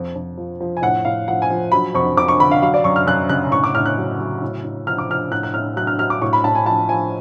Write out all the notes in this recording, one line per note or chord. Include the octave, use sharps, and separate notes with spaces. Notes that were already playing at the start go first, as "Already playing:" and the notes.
Already playing: F2
F2
F3
F3
G#5
A2 F#5
A2 F5
F3 F#5
G#5
F3
F#3 B5
F2 C#6
F2 D6
C#6
D3 B5
F5
F#3 F5
D5
F#2 C#6
F6
F#2 F#6
C#3 F#6
A2 C#6
D6
A2 F6
F#6
F#3
F#3
A2
A2
F3 F6
D6
F3 F6
A2 F#6
F#6
A2 F6
F#3 F#6
F6
F#3 F6
D6
A2 C#6
B5
A2 A5
G#5
F3 A5
F3 G#5